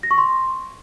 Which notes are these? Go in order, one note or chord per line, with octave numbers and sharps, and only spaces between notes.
A#6
C#6
C6